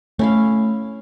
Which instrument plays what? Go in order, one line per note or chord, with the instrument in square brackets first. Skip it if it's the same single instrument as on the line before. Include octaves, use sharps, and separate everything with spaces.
[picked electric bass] A3 [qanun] C#4 E4 F5